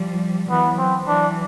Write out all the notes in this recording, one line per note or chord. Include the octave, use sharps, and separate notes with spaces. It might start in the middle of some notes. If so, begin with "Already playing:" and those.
Already playing: F3 G3
E3 F#3 B3
C4
E3 F#3 D4